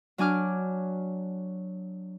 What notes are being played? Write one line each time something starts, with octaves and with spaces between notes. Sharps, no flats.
F#3 D4 G#5 D6 F6